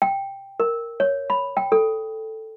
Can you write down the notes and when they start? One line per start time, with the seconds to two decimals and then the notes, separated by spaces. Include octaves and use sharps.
0.02 G5
0.60 A#4
1.00 C#5
1.30 B5
1.57 G5
1.72 A4